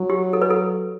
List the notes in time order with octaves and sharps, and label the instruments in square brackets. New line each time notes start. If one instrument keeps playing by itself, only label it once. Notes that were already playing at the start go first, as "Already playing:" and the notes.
Already playing: [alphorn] F#3
[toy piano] G4
A4
B4
A4